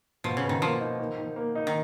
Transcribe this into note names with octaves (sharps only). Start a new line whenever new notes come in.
B2 F3
C#3
B2
D#3
F3 A#3
D#4
D#3
D#3
A#3
D#4
D#3